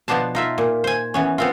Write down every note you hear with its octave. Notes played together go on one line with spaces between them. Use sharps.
B2 F3 B3 D4 C5 A5
D#4 F4 E5
A#2
C5 G#5
E3 B3 C#4
B3 C4 F4